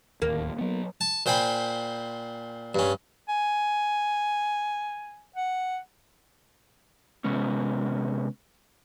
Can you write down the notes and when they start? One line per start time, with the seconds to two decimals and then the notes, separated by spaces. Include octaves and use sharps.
0.22 D1 D#2 A#3
0.59 F#3 B3
1.01 A5
1.26 A#2 C5 G5 G#5 B5
2.75 G2 C#4
3.29 G#5
5.36 F#5
7.24 C3 G#3 B3 C#4